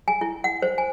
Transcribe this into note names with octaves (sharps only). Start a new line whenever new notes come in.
G#5
E4
F#5
C5
G#5